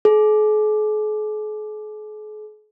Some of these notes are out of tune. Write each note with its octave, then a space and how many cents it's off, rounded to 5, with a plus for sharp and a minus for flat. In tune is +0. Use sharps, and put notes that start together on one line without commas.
G#4 +45